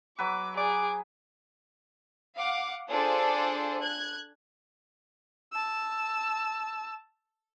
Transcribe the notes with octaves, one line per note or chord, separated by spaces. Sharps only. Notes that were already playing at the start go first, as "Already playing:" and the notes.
F#3 B4 D6
G#4 D6
F5 F#5 D6
D4 F4 G#4 A4 C5 D5
F#6 G#6
A5 E6